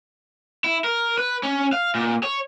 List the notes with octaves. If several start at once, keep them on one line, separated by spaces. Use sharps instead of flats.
E4
A#4
B4
C#4
F5
A#2
C#5